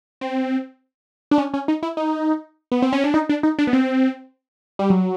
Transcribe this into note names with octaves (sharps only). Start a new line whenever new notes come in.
C4
D4
C#4
C#4
D#4
E4
D#4
B3
C4
C#4
D4
D#4
D4
D#4
D4
B3
C4
G3
F#3